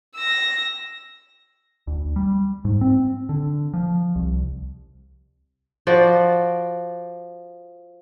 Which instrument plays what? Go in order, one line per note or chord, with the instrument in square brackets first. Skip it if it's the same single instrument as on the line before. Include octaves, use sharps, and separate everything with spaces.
[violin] E6 A#6
[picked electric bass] D2
G3
G#2
C4
D3
F3
C2
[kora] F3 F#4 D5